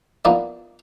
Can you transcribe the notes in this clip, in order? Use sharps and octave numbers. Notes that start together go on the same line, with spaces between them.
F3 A#3 B3 D#4 E4 D5